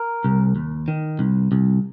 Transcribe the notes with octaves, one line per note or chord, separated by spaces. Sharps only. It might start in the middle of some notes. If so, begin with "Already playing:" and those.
Already playing: A#4
C2
D#2
D#3
C2
C2